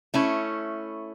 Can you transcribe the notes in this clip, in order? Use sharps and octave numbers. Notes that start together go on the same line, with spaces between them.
A3 C#4 E4